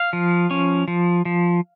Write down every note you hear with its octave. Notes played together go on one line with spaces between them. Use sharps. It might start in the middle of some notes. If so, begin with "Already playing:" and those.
Already playing: F5
F3
C#4
F3
F3